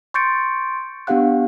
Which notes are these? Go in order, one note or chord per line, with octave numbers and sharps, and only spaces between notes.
C6 C#6 G6 A6 C#7 D7
B3 D4 G4 F5 F#5 F#6